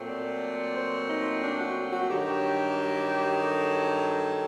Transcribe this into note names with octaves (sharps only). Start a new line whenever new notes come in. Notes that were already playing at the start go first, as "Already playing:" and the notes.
Already playing: A#2 F#3 A3 C4
D5
C5
D#4
D4
F#4
F#4
G2 D#3 F#3 G4
A4